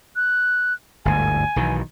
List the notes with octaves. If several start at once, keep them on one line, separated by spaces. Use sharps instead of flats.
F#6
G1 D2 G#2 G#5
B1 D#3 E3